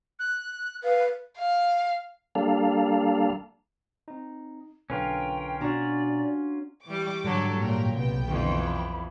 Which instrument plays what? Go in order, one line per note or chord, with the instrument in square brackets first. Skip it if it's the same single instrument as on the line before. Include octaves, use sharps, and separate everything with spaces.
[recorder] F#6
[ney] B4 [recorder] F5
[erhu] F5
[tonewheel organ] G3 A#3 D4 A4 F5
[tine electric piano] C4 D#4
[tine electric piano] B1 D3 B4 [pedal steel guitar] C#4 F4 A#4 [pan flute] G5
[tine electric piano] B2 A#5 C#6 [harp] D4 F#4 [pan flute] D5
[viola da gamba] E3 G3 [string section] G5 C#6 D6
[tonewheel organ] G#2 G3 [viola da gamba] D3 F#3 A4
[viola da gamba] A#2 [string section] A#4 C#5 G5
[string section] B1 B3 G5 [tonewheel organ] C3
[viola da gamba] F2 E3 [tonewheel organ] D3
[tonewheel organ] B5